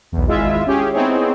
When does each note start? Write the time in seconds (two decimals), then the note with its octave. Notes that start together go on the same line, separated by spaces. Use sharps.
0.12 B1 E2
0.27 G#1 G#3 E4 F4 E5
0.67 C#4 G4 G#4
0.93 B3 C4 D#4 E4 G#4 C#5